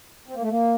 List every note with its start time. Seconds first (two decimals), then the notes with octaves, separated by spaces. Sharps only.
0.28 C4
0.35 A#3
0.42 A3
0.50 A#3